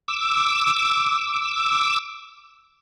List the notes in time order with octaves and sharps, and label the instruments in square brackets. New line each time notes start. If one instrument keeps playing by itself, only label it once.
[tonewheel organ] D6 E6